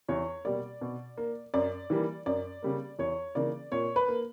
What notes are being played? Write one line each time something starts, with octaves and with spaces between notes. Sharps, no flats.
E2 C#5
B2 G3 A#3 D5
B2
A#3
F#2 D5
E3 G3 A#3
F#2 D5
C#3 G3 A#3
E2 C#5
C#3 E3 A#3 D5
A#2 C#5
B4
A#3